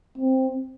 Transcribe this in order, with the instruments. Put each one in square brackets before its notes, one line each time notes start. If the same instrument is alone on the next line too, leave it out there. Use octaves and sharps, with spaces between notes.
[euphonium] C4